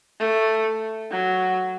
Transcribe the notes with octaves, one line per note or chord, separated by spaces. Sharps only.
A3
F#3